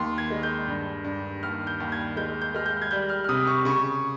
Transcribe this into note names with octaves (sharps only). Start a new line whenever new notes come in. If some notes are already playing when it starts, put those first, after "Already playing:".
Already playing: D#2 C6
G#6
G#3
G6
G2
G2
D#2 F6
G6
D#2
G#6
G#3 G6
G6
G#3 F6
G6
G#6
G3 G6
F6
F6
C3 D#6
C#6
C#3 C#6